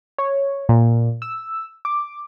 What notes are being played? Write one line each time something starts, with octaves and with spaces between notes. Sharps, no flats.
C#5
A#2
E6
D6